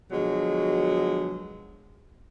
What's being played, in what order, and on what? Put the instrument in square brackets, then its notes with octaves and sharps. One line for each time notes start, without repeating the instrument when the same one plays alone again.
[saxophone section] B2 D3 F3 F#3 G#3